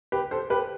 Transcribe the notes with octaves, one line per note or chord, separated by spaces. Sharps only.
G4 B4
A4 C5
G4 B4